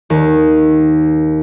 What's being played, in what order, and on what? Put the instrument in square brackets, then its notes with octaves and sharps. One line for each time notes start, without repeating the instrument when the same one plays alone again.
[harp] D#2